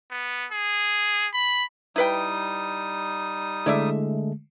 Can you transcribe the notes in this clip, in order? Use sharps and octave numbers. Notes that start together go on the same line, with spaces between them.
B3
G#4
B5
G3 D#4 E4 B4 G5 D#6
D3 G#3 A3 E4 D5 E5